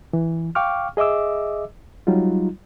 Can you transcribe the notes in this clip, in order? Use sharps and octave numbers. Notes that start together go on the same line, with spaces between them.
E3
F5 G5 C#6 D6 F6
G#4 D#5 E5 D6 E6
F#3 G3 D#4 F4